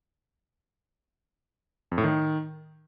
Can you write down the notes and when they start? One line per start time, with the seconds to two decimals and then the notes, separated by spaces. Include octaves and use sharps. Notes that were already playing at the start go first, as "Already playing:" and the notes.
1.91 F2
1.98 A2
2.04 D#3